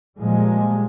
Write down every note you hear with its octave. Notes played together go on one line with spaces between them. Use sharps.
A#2 F3 G3 G#3 A#3